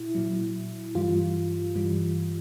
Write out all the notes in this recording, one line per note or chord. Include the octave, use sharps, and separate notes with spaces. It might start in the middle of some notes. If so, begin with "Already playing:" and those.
Already playing: A#2 E4
A#2 F#3
G2 E3 G3 F4
G2 E3 G3